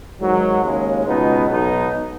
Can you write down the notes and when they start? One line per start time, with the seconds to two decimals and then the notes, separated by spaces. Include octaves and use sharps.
0.21 G#2 D#3 F#3
0.64 D#2 C#3 G#3
1.06 C#2 B2 B3 D#4
1.49 B1 B2 B3 D#4